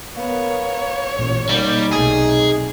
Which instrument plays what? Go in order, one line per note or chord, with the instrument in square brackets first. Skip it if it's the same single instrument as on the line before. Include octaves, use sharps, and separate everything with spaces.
[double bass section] B3 [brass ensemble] A#4 F5 [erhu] C#5
[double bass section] A1 A#2
[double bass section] B2 A#3 [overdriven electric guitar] G3 [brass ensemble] D#4
[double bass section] B1 C3 A3 [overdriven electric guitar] G#4